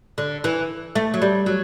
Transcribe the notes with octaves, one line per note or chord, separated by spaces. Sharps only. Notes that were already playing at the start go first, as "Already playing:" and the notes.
D3
E3
A3
F#3
G3
F#3